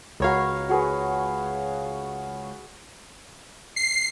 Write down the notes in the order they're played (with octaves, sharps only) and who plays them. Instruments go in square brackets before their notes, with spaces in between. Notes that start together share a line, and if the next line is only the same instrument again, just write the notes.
[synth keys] C#2 C#5 F5 [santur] F#4 A#4 B5
[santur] F#4 G#4 B4
[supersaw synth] C7